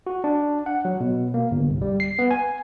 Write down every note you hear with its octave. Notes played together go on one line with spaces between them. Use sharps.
F#4
D4
F#5
F#3
B2
A#3
G1
C2
G3
C7
B3
G#5